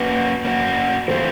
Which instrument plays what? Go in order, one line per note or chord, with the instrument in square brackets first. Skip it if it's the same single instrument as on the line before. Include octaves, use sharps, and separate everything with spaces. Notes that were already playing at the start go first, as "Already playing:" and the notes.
Already playing: [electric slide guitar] A#3 C#4 F#4 [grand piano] B4
[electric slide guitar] A#3 C#4 F#4
[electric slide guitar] E3 A3 C4 F4 [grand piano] C5